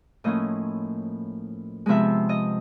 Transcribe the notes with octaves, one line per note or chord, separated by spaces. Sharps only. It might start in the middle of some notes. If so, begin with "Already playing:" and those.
A2 F3 A#3 C#4 D#5
C3 F3 G#3 B3 E5
D#5